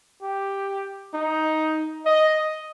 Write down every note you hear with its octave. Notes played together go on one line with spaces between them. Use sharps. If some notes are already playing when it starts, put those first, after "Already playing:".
G4
D#4
D#5